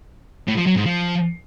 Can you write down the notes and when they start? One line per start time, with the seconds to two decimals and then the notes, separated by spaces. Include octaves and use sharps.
0.47 A2
0.57 F3
0.66 F#3
0.76 G#2
0.85 F3